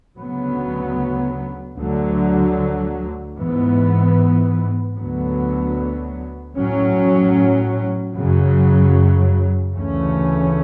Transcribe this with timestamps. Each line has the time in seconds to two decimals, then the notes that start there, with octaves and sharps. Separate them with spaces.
0.18 D2 C#3 F#3 B3
1.78 D2 D3 F#3
3.37 G#2 E3 B3
4.97 D2 D3 F#3 B3
6.56 A2 F#3 C#4
8.15 F#2 C#3 F#3
9.75 D2 C#3 E3 A3 C#4